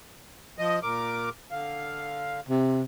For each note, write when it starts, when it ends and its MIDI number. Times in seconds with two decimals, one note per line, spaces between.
0.58 0.79 53
0.58 0.79 75
0.83 1.29 46
0.83 1.29 70
0.83 1.29 86
1.51 2.40 50
1.51 2.40 77
2.49 2.82 48